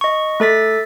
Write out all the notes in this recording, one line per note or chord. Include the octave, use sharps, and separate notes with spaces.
D#5 C#6
A3 A4 A6 B6